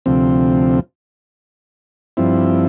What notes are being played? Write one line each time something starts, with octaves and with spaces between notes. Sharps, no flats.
D2 C3 F3 C4
G2 F3 C4 E4